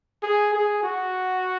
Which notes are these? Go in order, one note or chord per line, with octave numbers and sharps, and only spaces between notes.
G#4
G#4
F#4